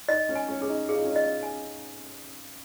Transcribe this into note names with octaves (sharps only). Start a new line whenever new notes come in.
D#4 D#5
C#4
G#5
C#4
C#4 G#4
D#4
F4 G#4
D#4
C#4
D#4 D#5
G#5